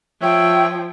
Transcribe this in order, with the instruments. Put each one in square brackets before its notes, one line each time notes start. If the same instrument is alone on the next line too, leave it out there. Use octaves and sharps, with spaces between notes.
[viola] F3 [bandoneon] C#5 E5 [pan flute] G5